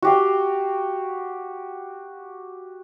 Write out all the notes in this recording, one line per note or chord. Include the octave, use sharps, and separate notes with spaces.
F#4 G4 F5